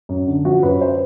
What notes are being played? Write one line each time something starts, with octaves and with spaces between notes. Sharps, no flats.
F#2
D3
F3 F#4
F#2 B4
C5